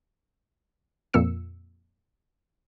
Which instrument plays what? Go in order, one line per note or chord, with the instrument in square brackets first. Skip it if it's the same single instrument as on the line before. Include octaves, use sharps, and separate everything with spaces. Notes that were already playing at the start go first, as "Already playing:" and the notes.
[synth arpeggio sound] F2 A#2 A#3 E6 C#7